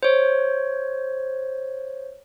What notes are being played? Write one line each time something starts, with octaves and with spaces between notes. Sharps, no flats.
C5 C#5